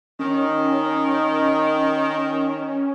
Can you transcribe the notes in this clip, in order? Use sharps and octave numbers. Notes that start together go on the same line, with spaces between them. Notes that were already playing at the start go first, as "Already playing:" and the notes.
D#3 C#4